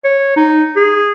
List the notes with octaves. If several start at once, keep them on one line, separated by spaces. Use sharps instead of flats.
C#5
D#4
G#4